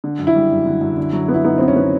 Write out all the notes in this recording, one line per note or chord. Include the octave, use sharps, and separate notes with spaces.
D3
F#2
E4
G3
F#2
D3
F#2
D3
F#3
B3
E4
B3 D#4
B3 C4
C#4
B3